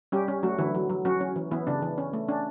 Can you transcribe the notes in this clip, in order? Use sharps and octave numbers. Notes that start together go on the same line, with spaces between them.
G3 C#4 G4
C#4
F#3 A3 F#4
D3 E3 E4
F#3
F#3
F#3 C#4 F#4
C#4
E3
E3 B3 E4
C#3 D4
E3
C#4
A3
C#4 D4